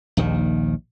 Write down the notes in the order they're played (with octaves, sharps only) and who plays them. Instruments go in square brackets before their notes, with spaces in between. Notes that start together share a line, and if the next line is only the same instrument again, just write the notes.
[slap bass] A#1 D#2 D#3